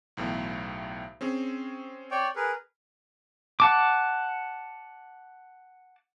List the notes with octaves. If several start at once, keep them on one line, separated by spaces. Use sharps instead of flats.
B1 E2 A2
C4 C#4 G#4
C#5 D5 G5
G#4 A#4 B4
F#5 A5 D6